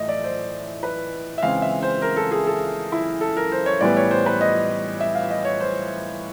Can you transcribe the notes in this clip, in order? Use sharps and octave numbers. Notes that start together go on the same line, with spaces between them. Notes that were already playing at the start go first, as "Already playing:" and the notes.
Already playing: A2 E3 A3 D#5 E5
D5
C5
B4
E5
C#3 E3 G#3 C4 F5
E5
C5
A#4
A4
G#4
A4
E4
A4
A#4
C5
C#5
A2 E3 G3 B3 D5
C#5
C5
B4
D#5
E5
F5
D#5
C#5
C5